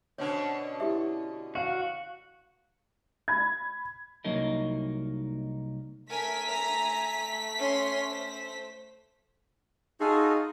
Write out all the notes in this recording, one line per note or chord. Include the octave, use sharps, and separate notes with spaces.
B2 D3 C#4 C5 C#5
E4 G4 E5
F#4 F5
B5 G#6
C2 F#3 A#3 D#4 A#4 D#5
A3 A#4 G#5 B6
G#5 A#5
C#4 C6
C5
D#4 F4 F#4 G#4 A4